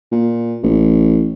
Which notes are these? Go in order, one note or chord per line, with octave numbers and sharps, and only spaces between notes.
A#2
A1